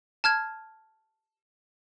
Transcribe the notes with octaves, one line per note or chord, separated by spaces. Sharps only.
A5 F6 G#6